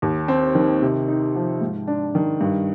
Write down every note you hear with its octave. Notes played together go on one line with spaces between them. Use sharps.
D#2
C4
D#3
C3
D#4
F3
G#2
D4
D#3
G2